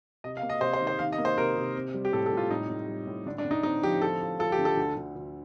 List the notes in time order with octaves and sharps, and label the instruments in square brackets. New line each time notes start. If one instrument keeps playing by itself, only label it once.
[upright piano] C3 [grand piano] D#5
[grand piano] F5
[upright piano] A#3
[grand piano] D#5
[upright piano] C3 [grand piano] C5
[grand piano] C5
[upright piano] D#3
[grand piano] C5
[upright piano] D#3 [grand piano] F5
[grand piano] D#5
[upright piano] A#3
[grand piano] C5
[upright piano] C3 [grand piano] A#4
[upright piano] C3
C4
G3
[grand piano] G4
[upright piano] A2 [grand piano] A4
[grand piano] A4
[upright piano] A2
[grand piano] F4
[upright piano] A2 [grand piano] D#4
[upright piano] A2
G3
A2
[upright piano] D3 [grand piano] D4
[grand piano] D4
[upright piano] D3
[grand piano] D#4
[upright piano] C4 [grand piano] D#4
[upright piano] F3 [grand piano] G4
[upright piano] F4 [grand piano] A4
[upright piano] F4
[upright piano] F4 [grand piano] A4
[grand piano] G4
[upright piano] D3
[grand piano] A4
[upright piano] D2
D2
D2